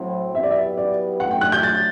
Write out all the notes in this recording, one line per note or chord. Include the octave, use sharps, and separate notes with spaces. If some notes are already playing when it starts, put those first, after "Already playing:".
Already playing: A2 F#3 C4 E4
F#3 B3 E4 G4 B4 E5
D5
E5
D5
F#2 F#3 A3 D4 F#5
G5
F#6
G6
A6